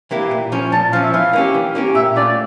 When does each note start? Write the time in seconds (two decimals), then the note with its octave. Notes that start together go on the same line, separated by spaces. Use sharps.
0.11 E3 A#3 E4 G4
0.31 A#2
0.52 F3 C#4
0.72 A#2 A5
0.93 F3 C#4 F5
1.04 E5
1.13 E3 F5
1.33 A#3 C#4 G4
1.55 E3
1.75 A#3 C#4 G4
1.95 A#2 E5
2.16 A3 C#4 F4 D5